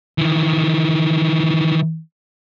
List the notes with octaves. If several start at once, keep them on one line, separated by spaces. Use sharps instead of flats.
D#3 E3